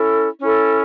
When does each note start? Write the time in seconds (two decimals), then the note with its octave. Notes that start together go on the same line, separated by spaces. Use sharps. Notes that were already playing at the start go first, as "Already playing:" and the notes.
Already playing: C#4 E4 A4
0.40 C#4 E4 A4